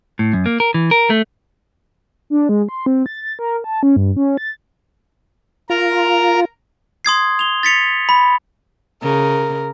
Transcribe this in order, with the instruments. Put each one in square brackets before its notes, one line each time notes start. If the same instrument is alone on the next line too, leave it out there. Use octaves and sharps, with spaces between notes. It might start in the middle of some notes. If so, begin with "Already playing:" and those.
[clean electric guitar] A2
F#2
A#3
A#4
E3
A#4
A3
[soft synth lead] D4
G#3
C6
C4
A6
A6
A#4
A5
C#4
G2
C#4
A6
[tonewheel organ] F4 [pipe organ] A#4 A#5
[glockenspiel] C6 D#6 G#6 C7
F7 G7
A6 B6 C#7 F7
B5
[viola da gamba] C#3 [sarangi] A#4